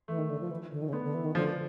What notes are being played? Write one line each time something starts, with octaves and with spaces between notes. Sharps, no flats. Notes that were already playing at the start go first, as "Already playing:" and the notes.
E3 A3
D#3
D3
F3
E3
D3
D#3
C#3
D3 B3
D3
E3
D#3
D3 F3